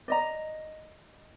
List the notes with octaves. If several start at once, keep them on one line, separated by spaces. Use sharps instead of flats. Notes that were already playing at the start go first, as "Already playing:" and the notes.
D5 D#5 A#5